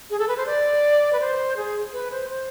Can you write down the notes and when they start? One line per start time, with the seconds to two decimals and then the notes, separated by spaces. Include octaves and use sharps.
0.10 G#4
0.19 A4
0.28 B4
0.37 C5
0.46 D5
1.13 B4
1.20 C5
1.56 G#4
1.93 B4
2.11 C5
2.30 C5